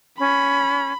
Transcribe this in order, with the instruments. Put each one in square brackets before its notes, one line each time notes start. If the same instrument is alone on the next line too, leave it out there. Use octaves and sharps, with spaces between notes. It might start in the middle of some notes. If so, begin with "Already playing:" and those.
[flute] C#4 [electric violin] B5